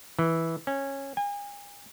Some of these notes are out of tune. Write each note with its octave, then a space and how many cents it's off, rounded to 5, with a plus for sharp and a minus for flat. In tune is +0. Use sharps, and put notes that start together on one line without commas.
E3 -10
C#4 -15
G#5 -40